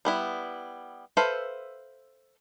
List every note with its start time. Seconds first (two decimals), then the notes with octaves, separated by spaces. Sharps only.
0.05 G3 B3 E4
1.17 A4 B4 C5 E5 F5